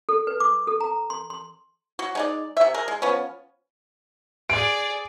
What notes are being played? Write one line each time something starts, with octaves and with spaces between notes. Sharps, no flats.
A4
B4
D6
A4
A#5
C6
C6
F#3 F#4
G#3 D#4 D5
C3 E5
G#4 A#4
G#3
F3 B3 C#4
G#4 D5 D7